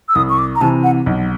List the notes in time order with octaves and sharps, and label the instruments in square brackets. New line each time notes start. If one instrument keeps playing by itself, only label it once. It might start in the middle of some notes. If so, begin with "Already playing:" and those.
[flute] E6
[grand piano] C2 [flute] D#6
[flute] C#6
D6
A#5
[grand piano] C3 E3 [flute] A5
[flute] F#5
[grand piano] B1